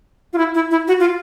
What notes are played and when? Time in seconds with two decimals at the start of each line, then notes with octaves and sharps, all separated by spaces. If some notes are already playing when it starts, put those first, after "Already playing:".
0.33 F4
0.38 E4
0.55 E4
0.71 E4
0.88 F#4
1.00 F4